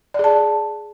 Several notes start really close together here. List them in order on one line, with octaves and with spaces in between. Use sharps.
D5 G#4 A5